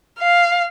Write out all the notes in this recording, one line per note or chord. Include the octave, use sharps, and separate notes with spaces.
F5